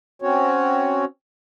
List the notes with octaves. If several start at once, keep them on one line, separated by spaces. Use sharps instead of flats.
C4 C#4 F#4 C#5